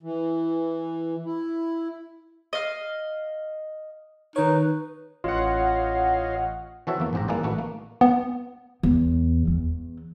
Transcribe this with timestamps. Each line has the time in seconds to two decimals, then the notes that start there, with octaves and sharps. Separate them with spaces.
0.03 E3
1.25 E4
2.53 D#5 F5
4.36 D#3 D#4 B4 C#5
5.24 A1 F4 C#5 D#5 F5 F#5
6.87 E3 C4 F#4 A4 C#5 E5
7.00 E2 A#3
7.13 A1 G#2 C4 G4 A#5
7.28 G3 A#3 E4 G#4 B4 D5
7.43 A1 D#3 A3 F#4 B4 F#5
7.58 A#3
8.01 B3
8.83 E2
9.47 E2